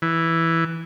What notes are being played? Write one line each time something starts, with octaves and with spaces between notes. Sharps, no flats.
E3